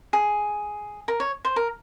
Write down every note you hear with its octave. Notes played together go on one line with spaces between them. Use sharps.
G#4
A#4
C#5
C5
A#4